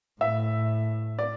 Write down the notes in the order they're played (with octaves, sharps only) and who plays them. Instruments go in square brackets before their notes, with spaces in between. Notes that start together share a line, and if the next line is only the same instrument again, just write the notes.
[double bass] A2 [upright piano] E5
[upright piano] D5